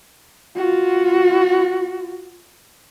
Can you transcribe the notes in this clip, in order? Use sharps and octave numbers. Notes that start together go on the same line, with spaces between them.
F4 F#4